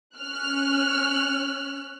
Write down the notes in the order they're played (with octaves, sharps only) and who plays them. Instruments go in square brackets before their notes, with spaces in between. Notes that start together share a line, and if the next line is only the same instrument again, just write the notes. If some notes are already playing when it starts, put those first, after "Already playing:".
[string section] C#4 F6 F#6